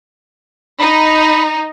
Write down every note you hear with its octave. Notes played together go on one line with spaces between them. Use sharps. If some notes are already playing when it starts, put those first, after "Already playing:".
D#4 B5